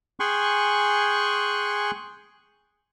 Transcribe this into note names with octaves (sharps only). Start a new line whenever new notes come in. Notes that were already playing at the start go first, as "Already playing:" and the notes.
G#4 G5 G#5 C6 C#6 F#6